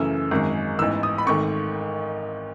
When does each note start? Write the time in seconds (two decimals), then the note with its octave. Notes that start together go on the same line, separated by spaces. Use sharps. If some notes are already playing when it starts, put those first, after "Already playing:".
Already playing: F#2 C#3 E3 A3 E6
0.31 G#1 F#2 D#3 G#3
0.79 A1 G#2 E3 B3 E6
1.03 D#6
1.18 B5
1.27 G#1 G#2 D#3 A3 C#6